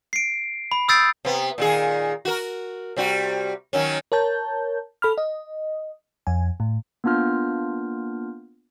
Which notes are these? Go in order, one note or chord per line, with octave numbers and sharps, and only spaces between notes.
C7 D7
B5
D#6 E6 G6 A6 C7 D7
C3 B3
A#2 D#3 G#4
F#4 A#4
C3 G3 F#4
D#3 F#3 C#4
A#4 C#5 A5 G6
A4 B5 F6
D#5
F2 G#5
A2
A#3 B3 D4 F4 F6 G6